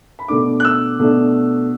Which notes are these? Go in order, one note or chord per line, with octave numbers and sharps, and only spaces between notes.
B5
B2 A3 D4 D6
F#6
E6
B2 A3 D4